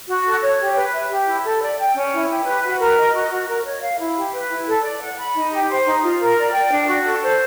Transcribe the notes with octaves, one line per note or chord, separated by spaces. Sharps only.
F#4
A4
C#5
G4
B4
E5
G4
E4
A4
D5
G5
C#4
E4
G4
B4
F#4
A#4
D#5
F#4
F#4
A#4
C#5
F5
E4
G4
B4
E4
A4
D5
F#5
B5
D#4
G4
C5
D#4
F4
A#4
D5
G5
D4
F#4
A4
C5